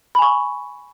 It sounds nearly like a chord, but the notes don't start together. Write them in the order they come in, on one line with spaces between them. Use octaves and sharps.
B5 G#5 C#6